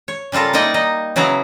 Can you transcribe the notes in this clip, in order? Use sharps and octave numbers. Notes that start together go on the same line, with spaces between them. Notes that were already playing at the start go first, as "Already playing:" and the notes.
C#5
C#3 G3 F4 A4 A#4
A#3 D#4 E4 D5 D#5 G5
D#4 D#5
C#3 F#3 B3 E4 A#5